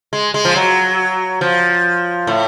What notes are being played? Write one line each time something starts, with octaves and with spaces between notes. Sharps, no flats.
G#3
G#3
F3
F#3
F3
A2